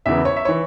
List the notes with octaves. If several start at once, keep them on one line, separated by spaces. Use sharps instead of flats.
E1 E2 C#3 E3 E5
C#5
E5
E3 C#5